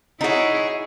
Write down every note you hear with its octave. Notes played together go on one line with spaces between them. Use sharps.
D#4 E4 F#4 G#4 C#5